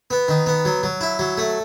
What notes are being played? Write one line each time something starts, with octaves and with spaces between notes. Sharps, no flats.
B3
D#3
B3
F#3
F#3
E4
F#3
A3